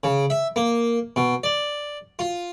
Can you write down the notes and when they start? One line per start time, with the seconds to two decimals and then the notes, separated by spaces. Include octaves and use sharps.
0.04 C#3
0.30 E5
0.56 A#3
1.16 B2
1.44 D5
2.19 F4